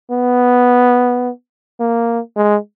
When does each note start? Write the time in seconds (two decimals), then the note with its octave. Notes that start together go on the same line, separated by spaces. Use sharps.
0.12 B3
1.80 A#3
2.37 G#3